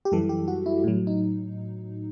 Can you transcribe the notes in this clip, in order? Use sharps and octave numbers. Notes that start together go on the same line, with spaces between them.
G4
F#2 E3 G3 A4
G4
F#4
E4
A2 F#3
D#4